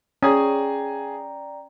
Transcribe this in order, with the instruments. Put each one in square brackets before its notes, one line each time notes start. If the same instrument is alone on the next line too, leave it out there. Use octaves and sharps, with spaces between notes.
[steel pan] C#4 [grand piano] G#4 G#5 D#6 [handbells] D5 G5 A#5